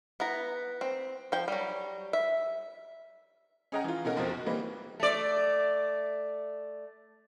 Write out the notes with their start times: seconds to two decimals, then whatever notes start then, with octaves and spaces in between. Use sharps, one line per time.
0.20 B3 E4 A#5
0.81 C4
1.32 F3 G5
1.48 F#3 G3
2.13 E5
3.72 C#4 G#4 D#5 F#5 G5 A#5
3.84 E3 F4
4.05 B2 C#4 D#4 A#4 F#5
4.16 F1 B1 F3 C4 A#4
4.29 F#4
4.46 E3 G3 A#3 C4 D#4 B4
5.00 A3 D5